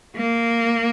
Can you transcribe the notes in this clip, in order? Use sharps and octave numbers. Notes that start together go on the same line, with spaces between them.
A#3